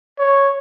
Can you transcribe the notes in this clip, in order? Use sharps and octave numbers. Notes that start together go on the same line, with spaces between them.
C#5